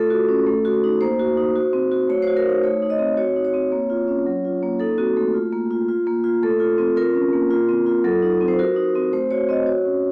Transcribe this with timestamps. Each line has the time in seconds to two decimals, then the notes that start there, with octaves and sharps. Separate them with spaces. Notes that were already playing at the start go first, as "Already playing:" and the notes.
Already playing: A3 F4 A4
0.10 F#4
0.29 C#4
0.46 A3
0.65 F#4
0.84 D#4
1.01 A#3 C5
1.20 F#4
1.37 D#4
1.55 F#4
1.73 C4
1.92 F#4
2.09 A3 C#5
2.22 C5
2.28 F#4
2.37 A#4
2.46 D#4 C5
2.63 A3 C#5
2.82 D#4
2.90 D#5
2.99 C4
3.17 F#4 C#5
3.36 D#4
3.45 C#5
3.54 C4
3.72 A#3
3.90 F4
4.08 C#4
4.27 F#3
4.45 F4
4.63 A#3
4.80 D#4 A4
4.98 C4 F#4
5.17 A3
5.34 F4
5.53 A#3
5.71 F4
5.88 F4
6.07 A#3
6.24 F4
6.43 A3 A4
6.60 F4
6.78 C4
6.96 F4 A#4
7.14 C#4
7.33 A#3
7.51 F4
7.69 C4
7.86 F4
8.04 F#3 A4
8.22 D#4
8.41 C4
8.48 C5
8.59 F#4 A#4
8.76 D#4
8.95 C4
9.13 A3 C5
9.31 F#4 C#5
9.49 C4 D#5
9.67 F#4 C#5
9.85 C#4